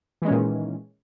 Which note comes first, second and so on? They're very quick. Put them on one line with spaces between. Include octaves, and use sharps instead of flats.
E3 G#3 C#4 A#2 D#3